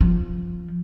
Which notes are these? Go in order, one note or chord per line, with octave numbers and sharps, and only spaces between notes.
F3